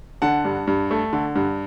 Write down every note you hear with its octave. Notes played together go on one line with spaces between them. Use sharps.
D3 F#5 A5
G2
G2
A3
D3
G2